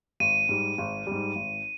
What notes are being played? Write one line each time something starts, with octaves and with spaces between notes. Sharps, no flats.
G#1 D#7
G#2 G3
G#1
G#2 G3
G#1